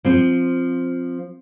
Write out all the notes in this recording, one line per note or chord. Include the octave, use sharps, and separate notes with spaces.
F3 C4